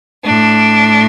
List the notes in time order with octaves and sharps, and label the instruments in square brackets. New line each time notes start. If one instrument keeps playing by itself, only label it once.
[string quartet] A2 D4